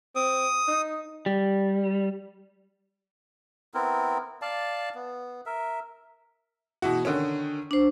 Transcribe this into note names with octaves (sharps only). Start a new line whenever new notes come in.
C4 D#6
D#4
G3
B3 C4 E4 A#4
D5 F5 A5
B3
A#4 E5
B2 E3 F#4
D3 D#3 C#4
D4 C5